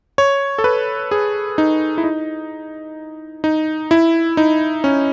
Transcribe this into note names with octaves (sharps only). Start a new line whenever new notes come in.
C#5
A4
B4
G#4
D#4
E4
D#4
D#4
E4
D#4
C#4